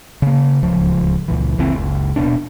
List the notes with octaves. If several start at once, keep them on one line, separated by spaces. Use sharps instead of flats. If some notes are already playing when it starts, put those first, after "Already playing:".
C#3 A#3
D1 C#2 F3
C#2 A#2 E3
F#1 C#2 E3 C4
F#1 C#2
D#1 B2 D4